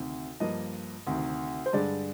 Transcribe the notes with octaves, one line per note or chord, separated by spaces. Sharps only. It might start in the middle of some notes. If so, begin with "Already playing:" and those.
Already playing: D2 C3 D#3
G2 F3 A#3 D#5
D2 C3 D#3
C5
G2 D3 G#3 D5